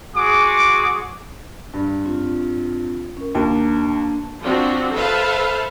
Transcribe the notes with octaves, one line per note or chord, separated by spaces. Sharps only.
G#3 F#4 G#4 D6
G2
C4 F4
C#4 A#4
D#2 A#3 D4 A5
F3 C4 D4 F#4
A4 B4 C5 E5 F5 A5